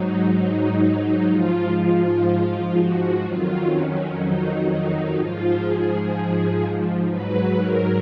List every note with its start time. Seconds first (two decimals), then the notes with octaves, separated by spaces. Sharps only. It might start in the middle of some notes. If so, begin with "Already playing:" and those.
Already playing: G#2 F#3 D#4
0.33 D#4
1.29 G#2 F3 F4
1.78 F4
2.26 F4
2.75 F#4
3.22 F2 D#3 F#3 F4
3.71 C#4
4.20 D#4
4.68 D#4
5.16 G#2 F3 F4
5.64 G#4
7.09 G#2 F#3 B4
7.57 A#4